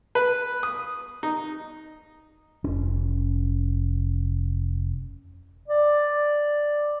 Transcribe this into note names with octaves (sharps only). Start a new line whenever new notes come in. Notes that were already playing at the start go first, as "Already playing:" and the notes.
B4
D#6
D#4
F1 C#4
D5